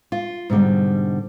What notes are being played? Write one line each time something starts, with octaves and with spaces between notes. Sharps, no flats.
F4
G#2 B2 D3 G3